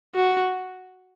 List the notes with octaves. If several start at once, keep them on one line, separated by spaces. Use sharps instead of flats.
F#4